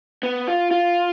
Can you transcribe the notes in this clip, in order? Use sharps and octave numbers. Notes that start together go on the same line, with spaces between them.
B3
F4
F4